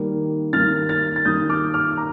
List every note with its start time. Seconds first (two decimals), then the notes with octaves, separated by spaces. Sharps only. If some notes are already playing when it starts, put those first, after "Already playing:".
Already playing: D#3 G3 A#3
0.53 D#3 G3 A#3 F6 A6
0.89 F6 A6
1.16 A6
1.25 D#3 G3 A#3 D#6 G6
1.49 D6 F6
1.74 D6 F6
1.97 A#5